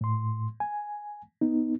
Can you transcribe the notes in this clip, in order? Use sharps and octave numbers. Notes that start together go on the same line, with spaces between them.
A2 C6
G#5
B3 D#4